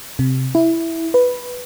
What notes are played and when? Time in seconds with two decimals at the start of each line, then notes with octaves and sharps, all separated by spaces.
0.19 C3
0.55 E4
1.14 B4